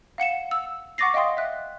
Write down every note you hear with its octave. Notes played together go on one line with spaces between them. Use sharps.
F5 F#5 C#7 E7
E6
F#5 C#6 D6 A6 A#6 C7
D#5 F5 G5 C6 D#6
E5 F#6